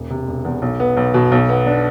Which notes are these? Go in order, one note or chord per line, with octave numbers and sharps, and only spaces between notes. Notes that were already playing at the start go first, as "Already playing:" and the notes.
Already playing: E1
C3
E1
E2
B1
B3
B1
B2
B1
B3
D4